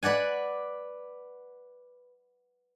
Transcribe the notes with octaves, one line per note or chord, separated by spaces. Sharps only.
B4 D5 F#5 G#5